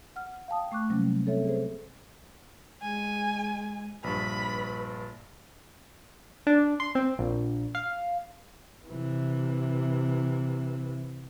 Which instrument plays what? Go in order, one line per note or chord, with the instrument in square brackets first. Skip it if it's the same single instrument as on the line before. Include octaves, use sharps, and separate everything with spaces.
[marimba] F#5 F6
F5 G5 A5 D#6
A3 C#6 D6 F#6
C3 F#3 G3 A#3 C#4
C4 A4 C#5 E5
G#4 A4 C5
[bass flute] G#3 [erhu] G#5
[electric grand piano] A#1 G2 [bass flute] B4 [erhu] B5
[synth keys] D4
C6
C4
A#1
F5
[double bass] C3 E3